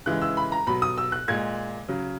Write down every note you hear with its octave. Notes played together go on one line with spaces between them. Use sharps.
C#3 E3 G#3 F#6
E6
B5
A#5
B2 F#3 B5
D#6
E6
F#6
A#2 G#3 G#6
C#3 F#3